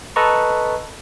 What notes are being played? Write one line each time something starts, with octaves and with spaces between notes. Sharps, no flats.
A4 B4 D#5 A5 A#5 C#6